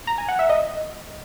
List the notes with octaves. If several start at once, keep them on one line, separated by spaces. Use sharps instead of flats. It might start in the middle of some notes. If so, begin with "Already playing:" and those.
A#5
G#5
F#5
E5
D#5